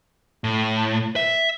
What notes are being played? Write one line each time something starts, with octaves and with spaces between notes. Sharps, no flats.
A2
E5